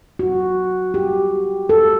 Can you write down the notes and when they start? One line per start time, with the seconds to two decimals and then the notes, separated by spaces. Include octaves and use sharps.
0.19 F#4
0.94 G4
1.69 A4